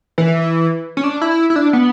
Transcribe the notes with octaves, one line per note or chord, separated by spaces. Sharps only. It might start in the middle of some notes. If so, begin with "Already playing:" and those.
E3
C#4
D4
E4
E4
D4
B3